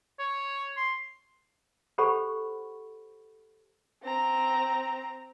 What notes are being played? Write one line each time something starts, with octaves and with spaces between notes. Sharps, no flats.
C#5
C6
G4 A4 C5 F#5 B5 C#6
C4 A#5